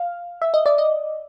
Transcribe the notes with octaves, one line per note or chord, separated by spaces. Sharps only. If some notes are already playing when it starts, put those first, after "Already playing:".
Already playing: F5
E5
D#5
D5
D#5